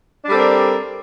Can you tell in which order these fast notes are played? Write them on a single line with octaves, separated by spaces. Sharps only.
D4 G3 A4 C4 A#4